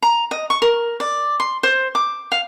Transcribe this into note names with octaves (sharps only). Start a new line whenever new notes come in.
A#5
D#5
C#6
A#4
D5
C6
C5
D6
F5